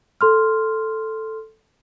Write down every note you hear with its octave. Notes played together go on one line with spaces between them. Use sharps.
A4 C6 F6